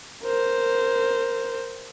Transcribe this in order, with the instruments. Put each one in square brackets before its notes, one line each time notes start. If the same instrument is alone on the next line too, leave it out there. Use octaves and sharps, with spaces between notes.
[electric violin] A#4 C5